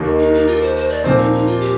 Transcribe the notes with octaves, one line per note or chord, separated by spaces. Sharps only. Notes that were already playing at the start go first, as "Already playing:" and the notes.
Already playing: D#2 D#3 A#3
D#4
D#4
F4
A#4
C5
C5
D5
A#2 F3 C4 C5
D#4
D#4
F4
G4